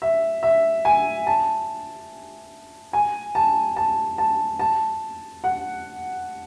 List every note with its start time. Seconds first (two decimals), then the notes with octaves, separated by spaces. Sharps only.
0.02 E5
0.43 E5
0.85 G#5
1.27 A5
2.93 G#5
3.35 A5
3.76 A5
4.18 A5
4.59 A5
5.44 F#5